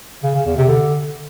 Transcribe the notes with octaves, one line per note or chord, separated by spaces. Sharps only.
C#3
C#3
E2
C3
D3